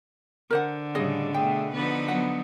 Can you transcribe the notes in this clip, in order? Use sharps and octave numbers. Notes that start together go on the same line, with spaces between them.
D3 A#4 C5 F#5
A2 C#3 G3 G#4 D#5
B2 A3 G#4 G5
D3 F3 B3 D#4 B4
F#3 B3 F#5